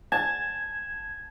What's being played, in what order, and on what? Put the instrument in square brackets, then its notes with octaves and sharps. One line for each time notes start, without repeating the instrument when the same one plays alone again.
[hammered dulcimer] A5 [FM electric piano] G#6